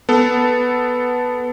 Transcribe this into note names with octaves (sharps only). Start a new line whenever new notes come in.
B3 A4